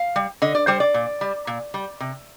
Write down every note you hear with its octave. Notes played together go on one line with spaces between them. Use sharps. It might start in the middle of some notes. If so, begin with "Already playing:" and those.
Already playing: F5
G3
D3 D#5
D5
G3 C5
D5
A#2
G3
A#2
G3
C3